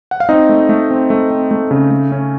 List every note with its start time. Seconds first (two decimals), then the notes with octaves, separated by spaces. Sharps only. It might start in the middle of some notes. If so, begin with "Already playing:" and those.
0.11 F#5
0.20 F5
0.29 C4 D#4 D#5
0.49 A3
0.69 A3
0.91 C4
1.10 A3
1.31 C4
1.51 A3
1.71 C#3
1.91 A3
2.12 C#4